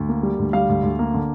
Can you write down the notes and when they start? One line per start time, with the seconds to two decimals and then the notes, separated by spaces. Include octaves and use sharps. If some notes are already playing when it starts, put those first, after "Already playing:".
Already playing: D2
0.09 A#3
0.23 G3
0.39 D2
0.53 G3 F5
0.69 D2
0.83 D2
0.99 A#3
1.14 D3